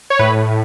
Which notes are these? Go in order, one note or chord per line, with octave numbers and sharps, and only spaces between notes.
C#5
A2 B4